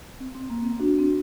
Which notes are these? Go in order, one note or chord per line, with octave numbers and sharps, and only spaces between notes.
C4
C4
A#3
C4
D4 F#4
C4